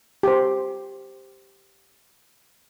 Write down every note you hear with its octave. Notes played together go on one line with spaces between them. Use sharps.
G4 C5